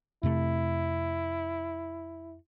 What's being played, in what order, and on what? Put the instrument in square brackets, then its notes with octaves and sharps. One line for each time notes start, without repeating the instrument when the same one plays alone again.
[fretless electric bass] F2 C3 A3 [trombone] E4